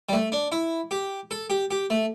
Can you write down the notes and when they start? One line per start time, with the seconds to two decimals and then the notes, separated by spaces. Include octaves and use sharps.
0.09 G3
0.13 A3
0.32 D4
0.52 E4
0.91 G4
1.31 A4
1.50 G4
1.71 G4
1.90 A3